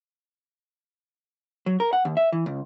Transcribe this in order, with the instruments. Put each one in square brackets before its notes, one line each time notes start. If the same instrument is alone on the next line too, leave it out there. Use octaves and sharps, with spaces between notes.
[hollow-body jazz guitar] F#3
A#4
F#5
D#2
E5
E3
C#2